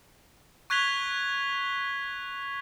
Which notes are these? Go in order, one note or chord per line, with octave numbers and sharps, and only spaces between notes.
C#6 F#6 G#6 B6 F7 G7